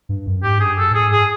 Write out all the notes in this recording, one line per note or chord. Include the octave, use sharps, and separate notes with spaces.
G2
F#2
G#2 G4
G2 G#4
F#2 A4
A2 G#4
G#2
G#4